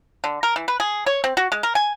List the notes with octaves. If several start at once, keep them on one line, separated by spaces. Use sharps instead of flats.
D3
A#4
E3
B4
G#4
C#5
C4
F#4
G#3
A#4
G#5